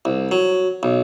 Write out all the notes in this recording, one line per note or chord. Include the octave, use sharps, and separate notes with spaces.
C2
F#3
B1